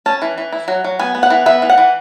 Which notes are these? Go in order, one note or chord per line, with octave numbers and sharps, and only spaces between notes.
C#4 A5
E3
E3
E4
F#3
F#3
B3 G#5
B3
F#5
E3
B3 E5
E3
F#5
E3